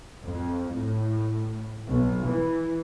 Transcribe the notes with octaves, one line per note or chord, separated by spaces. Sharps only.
F2
A2
B1
E3